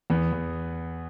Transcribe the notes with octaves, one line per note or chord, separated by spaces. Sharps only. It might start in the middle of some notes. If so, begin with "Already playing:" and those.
E2 B3
E2